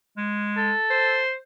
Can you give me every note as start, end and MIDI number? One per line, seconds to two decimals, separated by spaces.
0.17 0.71 56
0.57 1.21 69
0.90 1.35 72